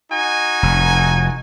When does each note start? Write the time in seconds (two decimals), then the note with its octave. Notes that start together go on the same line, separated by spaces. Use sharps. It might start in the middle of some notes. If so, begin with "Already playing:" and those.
0.12 D#4 F#4 G#5
0.63 F1